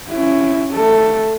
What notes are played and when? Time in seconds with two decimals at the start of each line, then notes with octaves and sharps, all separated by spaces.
0.10 C#4 E4
0.74 A3 A4